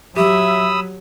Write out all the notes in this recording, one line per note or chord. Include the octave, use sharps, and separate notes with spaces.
F#3 G4 E5 B5 D#6 E6